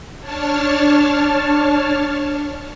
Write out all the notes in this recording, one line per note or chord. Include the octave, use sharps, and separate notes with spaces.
D4 C#5 A5 F6